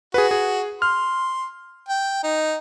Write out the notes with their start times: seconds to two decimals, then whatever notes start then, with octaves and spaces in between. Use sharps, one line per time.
0.14 F#4 G#4 B4
0.31 G#4
0.82 C6 F6
1.89 G5
2.23 D#4